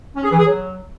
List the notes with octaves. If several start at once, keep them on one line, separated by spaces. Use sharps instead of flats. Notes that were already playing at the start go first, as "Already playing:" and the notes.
C#4
G#4
E3
G#4
F#3